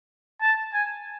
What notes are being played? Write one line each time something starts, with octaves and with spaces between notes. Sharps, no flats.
A5
G#5